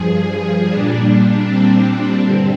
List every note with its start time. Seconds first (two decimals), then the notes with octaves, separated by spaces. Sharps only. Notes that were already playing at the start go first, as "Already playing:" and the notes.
Already playing: G2 F3 G#4
0.68 A#2 G3 D4
1.45 C4
1.84 C4
2.23 G2 D3 G3 C4